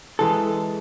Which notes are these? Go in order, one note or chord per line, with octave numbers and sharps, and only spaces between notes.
E3 G#3 A4